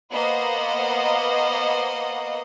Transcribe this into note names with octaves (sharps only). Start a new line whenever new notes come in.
A#3 B3 C5 D#5 F#5